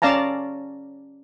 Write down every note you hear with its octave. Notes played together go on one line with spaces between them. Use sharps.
C#4 D5 F5 A5 A#5